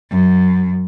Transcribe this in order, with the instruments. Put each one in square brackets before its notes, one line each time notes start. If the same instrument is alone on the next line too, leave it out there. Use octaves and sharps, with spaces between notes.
[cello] F#2